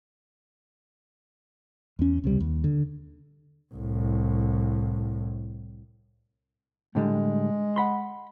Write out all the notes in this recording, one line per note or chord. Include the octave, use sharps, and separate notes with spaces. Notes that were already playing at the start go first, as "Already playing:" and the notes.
E2 C#4
C#2 C3 G3
D#2
D3
C2 A2
A2 D3 G3 G#3
F#5 B5 C6